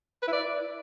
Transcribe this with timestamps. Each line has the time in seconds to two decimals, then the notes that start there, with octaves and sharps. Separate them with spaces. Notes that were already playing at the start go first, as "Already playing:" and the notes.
0.23 B4
0.28 E4
0.33 D5